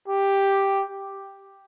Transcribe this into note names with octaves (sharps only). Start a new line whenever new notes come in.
G4